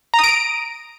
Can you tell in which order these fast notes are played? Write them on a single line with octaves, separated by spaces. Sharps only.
A#5 D#6 D7